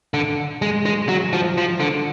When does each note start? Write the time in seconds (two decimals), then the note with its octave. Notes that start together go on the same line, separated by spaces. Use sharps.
0.14 D3
0.62 G#3
0.86 G#3
1.09 F#3
1.33 F3
1.58 F3
1.80 D3